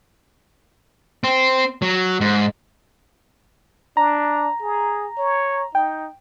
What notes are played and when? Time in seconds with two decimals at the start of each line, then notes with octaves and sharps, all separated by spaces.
1.24 C4
1.82 F#3
2.21 G#2
3.97 D4 A#5
4.62 G#4
5.18 C#5
5.75 D#4 G5